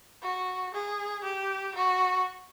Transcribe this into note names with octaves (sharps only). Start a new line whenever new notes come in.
F#4
G#4
G4
F#4